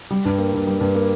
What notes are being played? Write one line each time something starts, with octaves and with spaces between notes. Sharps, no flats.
G3
G2
A#3
G2
G3
G2
A#3